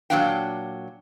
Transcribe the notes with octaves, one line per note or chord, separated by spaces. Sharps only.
A#2 F#3 G#3 D4 F5 G5